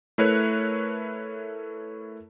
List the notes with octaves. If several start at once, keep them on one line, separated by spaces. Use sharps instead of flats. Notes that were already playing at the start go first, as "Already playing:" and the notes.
A3 E4 A#4 B4 C#5 F#6